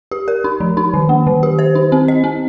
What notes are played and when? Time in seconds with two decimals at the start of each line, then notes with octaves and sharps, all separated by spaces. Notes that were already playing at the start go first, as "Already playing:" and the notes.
0.12 G4
0.28 A#4
0.44 D#4
0.60 F3
0.77 D#4
0.94 D#3
1.09 A#3
1.27 D#3
1.43 G4
1.59 C5
1.75 D#4
1.92 C4
2.08 D#5
2.24 C4